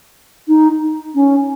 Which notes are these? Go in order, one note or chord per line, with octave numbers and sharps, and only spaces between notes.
D#4
C#4